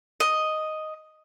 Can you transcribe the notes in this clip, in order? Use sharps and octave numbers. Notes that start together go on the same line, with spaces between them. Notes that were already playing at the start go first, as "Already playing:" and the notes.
D#5